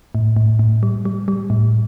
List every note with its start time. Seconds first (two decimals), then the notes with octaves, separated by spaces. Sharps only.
0.15 A2
0.37 A2
0.59 A2
0.83 G3
1.05 G3
1.28 G3
1.50 A2